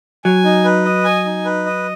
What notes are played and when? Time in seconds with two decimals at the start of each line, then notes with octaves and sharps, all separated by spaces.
0.25 F#3 G#5
0.45 D#4
0.64 B4
0.85 D#5
1.04 G#5
1.25 D#4
1.45 B4
1.66 D#5